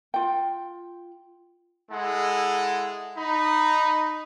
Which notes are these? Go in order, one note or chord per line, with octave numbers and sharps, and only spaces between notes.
F4 G5
G#3 E4 A4 F#5
D#4 B5